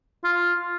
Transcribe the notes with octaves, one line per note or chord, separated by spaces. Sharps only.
F4